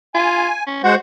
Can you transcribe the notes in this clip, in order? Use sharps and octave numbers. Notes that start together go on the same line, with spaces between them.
F4 G#5
C#4
G#3 F#4 C5 F#5